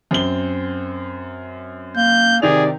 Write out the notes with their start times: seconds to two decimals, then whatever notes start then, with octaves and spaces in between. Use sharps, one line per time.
0.11 F#2 C4 G7
1.96 A#3 G6
2.42 C3 D#3 G#4 D5 F7